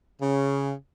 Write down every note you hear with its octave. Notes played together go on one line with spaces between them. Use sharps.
C#3